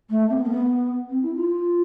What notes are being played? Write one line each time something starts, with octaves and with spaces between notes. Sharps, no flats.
A3
C4
B3
A#3
B3
C4
E4
F4